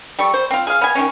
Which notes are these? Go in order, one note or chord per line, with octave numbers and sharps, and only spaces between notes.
G3 A4 C#6
C5
C4 F4
G#4 F5
B3 G#5
D#3 C4 C#4